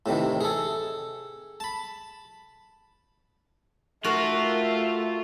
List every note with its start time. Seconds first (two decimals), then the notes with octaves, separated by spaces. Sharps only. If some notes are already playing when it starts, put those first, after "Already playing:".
0.06 A2 C3 D#3 E3
0.41 G#4 A4
1.60 A5 B5
4.04 A3 F4 F#4 A#4